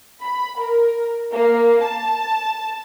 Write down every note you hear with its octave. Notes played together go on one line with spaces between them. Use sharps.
B5
A#4
A#3
A5